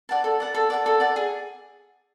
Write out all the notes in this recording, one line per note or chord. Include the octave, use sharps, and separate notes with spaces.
D5 F#5 A5
A4
D5 F#5 A5
A4
D5 F#5 A5
A4
D5 F#5 A5
G#4